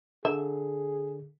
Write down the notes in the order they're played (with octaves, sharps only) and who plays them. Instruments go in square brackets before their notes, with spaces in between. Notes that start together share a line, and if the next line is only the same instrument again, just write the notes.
[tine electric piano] D3 [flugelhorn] G#4 [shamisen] E5